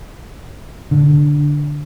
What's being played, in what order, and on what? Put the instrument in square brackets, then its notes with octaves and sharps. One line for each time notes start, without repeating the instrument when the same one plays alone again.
[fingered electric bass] D3